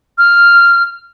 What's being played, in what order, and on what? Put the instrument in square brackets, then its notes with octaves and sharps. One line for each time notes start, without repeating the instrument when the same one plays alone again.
[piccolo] F6